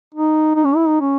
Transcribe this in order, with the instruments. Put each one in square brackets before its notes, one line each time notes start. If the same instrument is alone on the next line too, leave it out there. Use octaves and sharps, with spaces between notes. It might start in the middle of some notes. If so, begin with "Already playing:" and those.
[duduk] D#4
D#4
C#4
E4
D#4
C#4